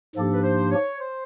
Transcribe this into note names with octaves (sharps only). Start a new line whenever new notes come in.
G#2 F3 A#3 D4 G4 A4
B4
C5
C#5
C5